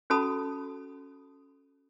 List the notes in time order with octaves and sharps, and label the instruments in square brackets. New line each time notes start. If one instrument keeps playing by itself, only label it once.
[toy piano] C#4 F#4 A4 A5 B5 D#6